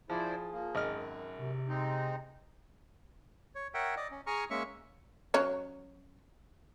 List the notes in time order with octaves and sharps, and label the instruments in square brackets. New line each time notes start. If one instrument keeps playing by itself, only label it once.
[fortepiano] F3 [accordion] E4 C5 D5 [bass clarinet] G#4
[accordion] F3 A#3
[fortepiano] G#1 D#5 F6 [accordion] F#2
[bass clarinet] C3
[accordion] G#3 C4 D#4
[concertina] C#5
A#4 C#5 E5 F#5 G5
D5 D#5
C#4
G#4 G#5 A#5 C#6 F6
G#3 A#3 C#4 E5 C#6
[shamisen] F#3 C#4 C#5